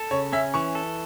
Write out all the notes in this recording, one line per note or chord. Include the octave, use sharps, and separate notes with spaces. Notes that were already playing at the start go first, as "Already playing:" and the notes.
Already playing: A4
C#3 C#5
C#4 E5
E3 C#6
A4